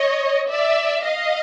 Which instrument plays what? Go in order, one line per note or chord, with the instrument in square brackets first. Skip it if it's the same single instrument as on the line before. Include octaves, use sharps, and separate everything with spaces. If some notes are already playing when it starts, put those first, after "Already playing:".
Already playing: [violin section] C#5 D#5
D5 E5
D#5 F5